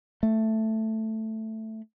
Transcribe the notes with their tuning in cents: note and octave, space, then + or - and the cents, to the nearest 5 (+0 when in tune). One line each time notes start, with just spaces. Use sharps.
A3 +5